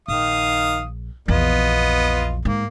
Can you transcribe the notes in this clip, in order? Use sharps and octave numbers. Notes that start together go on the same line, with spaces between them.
A#1 D#3 F5 D#6
A#1 E2 B3 F4 D#5
G#2 A#3